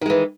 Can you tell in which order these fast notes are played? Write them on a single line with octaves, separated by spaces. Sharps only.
D#3 G#3 E3